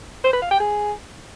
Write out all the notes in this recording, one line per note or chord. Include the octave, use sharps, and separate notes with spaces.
C5
B4
F5
G5
G#4